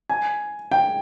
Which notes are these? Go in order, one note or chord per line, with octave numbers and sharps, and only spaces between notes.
G#5
G5